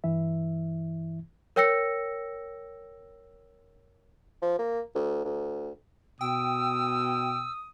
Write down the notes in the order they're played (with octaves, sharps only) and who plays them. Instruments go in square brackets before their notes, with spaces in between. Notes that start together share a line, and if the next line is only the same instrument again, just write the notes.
[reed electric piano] G2 E3 E4 E5
[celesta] A#4 C#5 G5 E6 A#6 C#7
[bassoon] F3
A#3
D2
D2
[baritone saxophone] B2 [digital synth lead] G5 [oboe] D#6 [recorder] E6